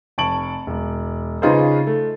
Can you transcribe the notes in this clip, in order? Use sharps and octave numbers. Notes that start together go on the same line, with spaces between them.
F1 A5 C#6 D7 F#7
E1
C#3 D#4 F4 G#4 B4 C5
A3